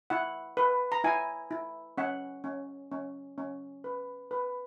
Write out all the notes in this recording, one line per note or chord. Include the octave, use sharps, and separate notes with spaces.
E4 F#5
B4
A#5
E4 G#5
E4
C#4 F#5
C#4
C#4
C#4
B4
B4